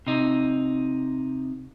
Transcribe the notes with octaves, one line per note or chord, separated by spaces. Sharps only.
C3 D#4